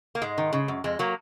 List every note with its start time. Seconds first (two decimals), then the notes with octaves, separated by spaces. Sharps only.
0.15 A#3
0.22 G#2 G#3
0.38 D#3
0.53 C#3
0.68 F#2
0.84 F2 G#3
0.99 F#3 A#3